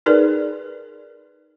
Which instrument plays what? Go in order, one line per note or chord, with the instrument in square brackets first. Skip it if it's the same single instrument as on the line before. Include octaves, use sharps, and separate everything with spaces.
[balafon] D#4 G#4 A#4 B4 D5